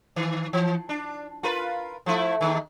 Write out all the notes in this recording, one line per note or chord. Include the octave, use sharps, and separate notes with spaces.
D#3
E3
D4
F4 A#4 B4
F3 A3 E4
D#2 G#2 D#3